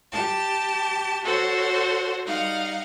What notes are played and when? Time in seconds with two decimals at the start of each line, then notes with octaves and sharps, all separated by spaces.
0.10 G4 A5
1.23 F#4 A4 C5 C#5
2.26 G3 D#4 F5 F#5